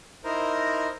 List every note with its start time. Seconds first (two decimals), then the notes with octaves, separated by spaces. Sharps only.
0.24 D#4 E4 A#4 C5 A#5